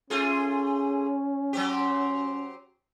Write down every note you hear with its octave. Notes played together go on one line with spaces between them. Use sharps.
A3 C#4 F4 G#4
F#3 C4 G4